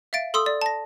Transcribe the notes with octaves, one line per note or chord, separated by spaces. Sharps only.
E5 F5 A6 D7
A4 C6 D#6 E6
D5
A5 A#6